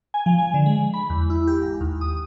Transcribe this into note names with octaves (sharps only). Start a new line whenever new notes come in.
G#5
F3
G#5
D3
G#3
B5
E2
E4
G4
G#1
D#2
D#6